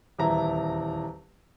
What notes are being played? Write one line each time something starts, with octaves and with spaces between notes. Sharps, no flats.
D#1 E2 E4 A#5